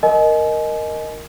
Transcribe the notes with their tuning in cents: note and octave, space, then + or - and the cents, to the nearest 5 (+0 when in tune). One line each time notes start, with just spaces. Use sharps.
A#4 +0 D#5 +0 G#5 +35